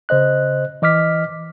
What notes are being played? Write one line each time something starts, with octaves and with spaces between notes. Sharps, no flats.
C#3 C5 D#5 F#6
E3 D#5 D6 F6 B6